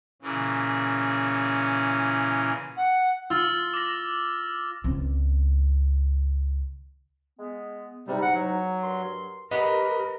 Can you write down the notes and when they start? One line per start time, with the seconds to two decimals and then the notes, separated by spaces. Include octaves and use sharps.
0.22 A#2 C#3 E3 C#4
2.77 F#5
3.30 F4 E6 F6 A6
3.74 D6 A#6
4.84 C#2 C4
7.38 G#3 B3
8.07 E2 G#2 C3 G3 D#4
8.22 F#5
8.34 F#3
8.82 G2 A#4 C6
9.51 G4 A#4 B4 D#5